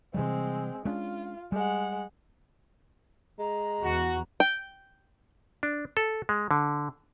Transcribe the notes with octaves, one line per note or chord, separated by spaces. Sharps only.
C3 E3 G3 G#3 C4
G#3 C#4 D4 F4
G3 G#3 F#5
G#3 A#5
E2 E3 F#4
G5
D4
A4
G#3
D3